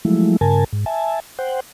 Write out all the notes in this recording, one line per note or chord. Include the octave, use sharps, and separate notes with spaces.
F3 F#3 G#3 A3 E4
G2 C#3 A#4 G#5 A5
G#2
E5 G#5 A5
C5 F#5 G5